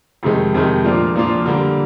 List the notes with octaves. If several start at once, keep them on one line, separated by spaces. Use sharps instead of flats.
F2 C3 D#3 G#3
F2 C3 D#3 G#3
A#2 F3 A#3 D4 F4
A#2 F3 A#3 D4 F4
D3 G3 A#3